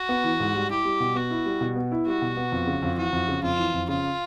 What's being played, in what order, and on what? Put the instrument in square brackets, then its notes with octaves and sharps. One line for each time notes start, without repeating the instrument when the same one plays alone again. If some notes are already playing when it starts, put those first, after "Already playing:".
Already playing: [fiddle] F#4
[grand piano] B3
E3
G#2
G3
[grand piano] E4 [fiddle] G4
[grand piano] G3
B2
[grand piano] B3 [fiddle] F#4
[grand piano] E4
G3
B2
B3
E4
[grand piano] G3 [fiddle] F#4
[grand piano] B2
B3
F2
C#3
F2
[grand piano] E3 [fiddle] F#4
[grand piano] F2
C#3
[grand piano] F2 [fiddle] F4
[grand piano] E3
F2
[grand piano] C#3 [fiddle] F4